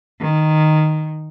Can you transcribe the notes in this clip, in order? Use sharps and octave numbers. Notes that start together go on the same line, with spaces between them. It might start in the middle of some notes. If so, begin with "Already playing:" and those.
D#3